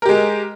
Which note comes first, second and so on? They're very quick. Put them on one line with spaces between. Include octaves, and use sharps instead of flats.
A#4 G4 G#3